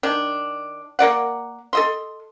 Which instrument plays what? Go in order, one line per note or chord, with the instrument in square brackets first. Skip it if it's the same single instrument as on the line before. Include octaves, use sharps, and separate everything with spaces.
[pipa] D#3 D4
A#3 A#4 D5 F#5
A4 D#5 C6